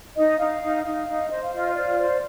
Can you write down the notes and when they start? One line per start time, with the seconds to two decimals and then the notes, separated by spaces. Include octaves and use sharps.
0.16 D#4 D#5
0.39 D#4 F5
0.61 D#4
0.84 D#4 F5
1.07 D#4
1.30 C5 D#5
1.42 F5
1.53 F4 D#5
1.75 C5 D5
1.98 C5